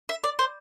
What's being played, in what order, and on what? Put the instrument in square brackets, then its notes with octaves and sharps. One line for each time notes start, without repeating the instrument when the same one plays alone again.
[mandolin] E5
D5
C5